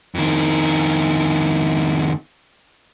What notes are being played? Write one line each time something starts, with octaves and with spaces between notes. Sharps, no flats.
F2 D#3